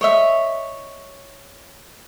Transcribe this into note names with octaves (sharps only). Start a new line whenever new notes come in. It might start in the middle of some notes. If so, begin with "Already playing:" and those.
C#5 D#5 E5